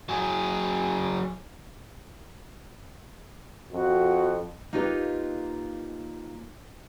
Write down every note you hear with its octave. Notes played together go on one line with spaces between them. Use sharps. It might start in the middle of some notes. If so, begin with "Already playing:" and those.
F#3 G#4
F2 F#4
A#3 D#4 F4 G4 B4